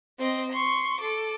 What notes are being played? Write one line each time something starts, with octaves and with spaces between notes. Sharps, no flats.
C4 D#5
C6 C#6
A4 D6